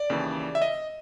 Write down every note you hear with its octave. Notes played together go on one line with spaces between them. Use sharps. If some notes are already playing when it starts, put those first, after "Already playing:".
Already playing: D5
D#2 C#3 E3
E5
D#5